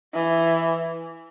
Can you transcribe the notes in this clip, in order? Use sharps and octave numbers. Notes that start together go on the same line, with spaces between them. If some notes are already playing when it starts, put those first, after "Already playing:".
E3